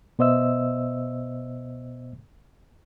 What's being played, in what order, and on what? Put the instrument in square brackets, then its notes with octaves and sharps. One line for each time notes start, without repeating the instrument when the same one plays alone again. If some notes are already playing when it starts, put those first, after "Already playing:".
[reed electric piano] B2 B3 C5 D#5 E5 E6